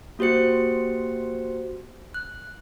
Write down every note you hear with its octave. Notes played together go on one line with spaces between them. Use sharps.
A#3 F#4 G4 C5 C#7
F#6